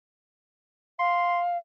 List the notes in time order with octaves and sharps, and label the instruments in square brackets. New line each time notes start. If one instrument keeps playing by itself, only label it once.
[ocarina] F5 [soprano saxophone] C6